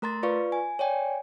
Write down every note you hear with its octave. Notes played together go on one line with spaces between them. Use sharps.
A3 A#4 A#5 C6 A6
F4 B4 D5 F5 C#6
G#5
C#5 D5 G5 G#5